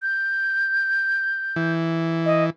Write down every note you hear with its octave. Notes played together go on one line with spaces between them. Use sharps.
G6
E3
D#5